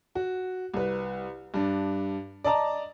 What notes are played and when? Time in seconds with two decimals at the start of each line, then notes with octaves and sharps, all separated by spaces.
0.15 F#4
0.74 C2 B4
1.54 G2 D4
2.44 D5 D#5 A5 A#5